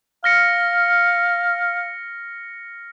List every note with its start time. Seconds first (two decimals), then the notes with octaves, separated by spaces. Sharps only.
0.24 F5 F6 A#6 C#7